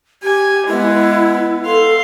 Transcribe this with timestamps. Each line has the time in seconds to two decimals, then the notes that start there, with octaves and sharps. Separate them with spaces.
0.23 G4 G#5
0.67 G#3 B3 E4
1.65 A4 F5 C6